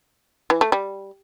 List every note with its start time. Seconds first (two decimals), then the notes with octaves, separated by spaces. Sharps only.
0.50 E3
0.61 A3
0.72 G3